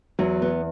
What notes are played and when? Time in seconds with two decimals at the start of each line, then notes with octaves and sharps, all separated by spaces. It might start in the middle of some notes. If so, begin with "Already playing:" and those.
0.19 E2 F#3
0.42 B3